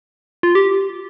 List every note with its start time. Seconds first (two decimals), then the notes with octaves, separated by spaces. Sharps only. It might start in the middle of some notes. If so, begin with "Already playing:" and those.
0.43 F4
0.55 G4